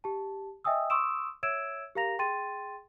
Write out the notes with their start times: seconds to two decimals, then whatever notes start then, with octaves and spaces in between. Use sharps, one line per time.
0.04 G4 A5
0.64 D#5 E5 G5 G#5 D#6 E6
0.90 C6 C#6 D#6 E6 D7 E7
1.43 C#5 E5 E6 G#6 D7 E7
1.95 G4 A#4 F5 A#5 A#6 F7
2.19 G#4 G5 C6 A6 D#7